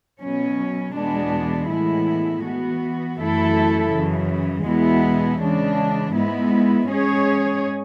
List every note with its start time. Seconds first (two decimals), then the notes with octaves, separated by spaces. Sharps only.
0.20 B2 F#3 C#4
0.94 E2 B2 G#3 B3 D4
1.68 A2 E3 G#3 B3 E4
2.43 E3 B3 F#4
3.17 F#2 E3 A3 E4 A4
3.91 F#2 C#3 E3
4.65 E2 B2 G#3 B3 E4
5.39 C#3 E3 G#3 D4
6.14 G#2 G#3 B3 E4
6.87 G#2 G#3 C#4 G#4 C#5